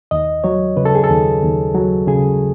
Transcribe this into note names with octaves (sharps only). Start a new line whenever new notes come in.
D#2 D#5
F#3 C#5
C#3 B4
A4
G#4
A4
D#2
D#2
F#3
C#3 G#4